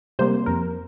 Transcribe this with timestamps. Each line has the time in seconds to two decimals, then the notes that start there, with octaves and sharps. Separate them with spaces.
0.19 C3 G3 A#3 C5
0.46 F2 A#4